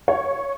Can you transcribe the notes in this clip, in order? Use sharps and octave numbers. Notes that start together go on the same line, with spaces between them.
C#5